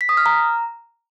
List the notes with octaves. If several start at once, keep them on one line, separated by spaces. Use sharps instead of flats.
B6
D#6
F6
A#5